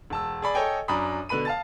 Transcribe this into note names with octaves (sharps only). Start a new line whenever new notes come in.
E1 A5 E6
G#4 D5 B5
A4 C#5 D#5 G5 G#5
F#2 D4 A#5 B5 D#6
B2 D3 B4 B5 D#7
F5 A5 A6